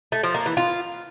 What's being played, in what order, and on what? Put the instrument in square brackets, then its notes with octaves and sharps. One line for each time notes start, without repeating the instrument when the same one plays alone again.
[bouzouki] A3
F3
A#3
E3
F4